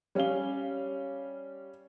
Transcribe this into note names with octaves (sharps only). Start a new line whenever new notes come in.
G3 C#4 G4 F5 G7